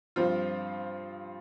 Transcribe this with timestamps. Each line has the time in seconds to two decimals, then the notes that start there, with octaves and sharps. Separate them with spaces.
0.16 G2 F3 C4 F4